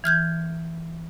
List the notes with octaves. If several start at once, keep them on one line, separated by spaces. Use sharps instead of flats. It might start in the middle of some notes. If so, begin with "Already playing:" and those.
E3 F6 G6 G#6